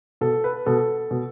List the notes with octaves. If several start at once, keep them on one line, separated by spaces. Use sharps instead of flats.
B2 A4
B4
B2 A4
B2